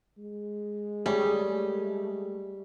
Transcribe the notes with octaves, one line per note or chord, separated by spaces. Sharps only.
G#3
G3 A3 G#4 C#5